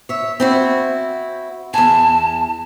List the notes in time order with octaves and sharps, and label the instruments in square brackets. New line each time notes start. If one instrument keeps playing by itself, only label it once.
[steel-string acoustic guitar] C#5 E5
C4 E4 F#4
[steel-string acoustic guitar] E2 G#5 [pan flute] A5